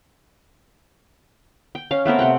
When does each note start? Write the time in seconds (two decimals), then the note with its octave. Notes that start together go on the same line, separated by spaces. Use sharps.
1.75 G5
1.91 C#4 F5
2.05 A3 B3 C4 A#4
2.19 C3 F#5 G5